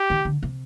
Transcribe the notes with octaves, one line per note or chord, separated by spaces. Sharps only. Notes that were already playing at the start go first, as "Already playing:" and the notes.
Already playing: G4
D#3
D3
C3